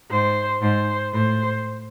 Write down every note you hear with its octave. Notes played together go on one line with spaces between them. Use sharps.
G#2 C5
G#2 C5
A2 C5